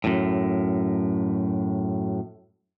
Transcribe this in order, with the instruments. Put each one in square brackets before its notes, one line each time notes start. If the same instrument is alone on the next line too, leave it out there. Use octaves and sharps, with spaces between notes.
[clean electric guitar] F#2 A2